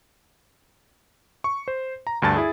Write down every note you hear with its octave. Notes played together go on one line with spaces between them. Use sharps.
C#6
C5
A#5
D2 G2 A5 A6
E4 G#4